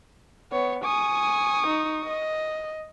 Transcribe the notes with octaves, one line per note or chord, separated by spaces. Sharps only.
B3 C#5
G#5 C#6 D#6
D#4
D#5